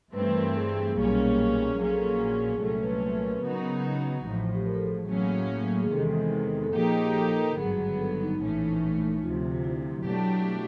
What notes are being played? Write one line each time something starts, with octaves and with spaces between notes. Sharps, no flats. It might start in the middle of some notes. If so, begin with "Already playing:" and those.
G2 E3 A3 C4 B4
A#4
G#4
G#4
B1 A#2 G3 A#3 C#4 G#4
A#1 A#2 F#3 A#3 C#4 G#4
A4
G#4
C2 A#2 F#3 A3 C#4 A4
B4
B4
A#4
B4
C#3 F#3 B3 D#4 F#4 A#4
A1 A2 F3
G4
A#4
A4
G#4
A2 F#3 A#3 C#4
G#4
E2 C3 D#3 G#3 A4
A4
A#2 F3 A#3 D#4 G4 G#4
G#4
A4
A4
A#4
G#1 G2 D3 F#3 B3 G#4
G#4
A4
D#4
A#1 A2 E3 A3 C#4
D2 C3 F3 F4
F4
E4
B2 F#3 A3 D4 G4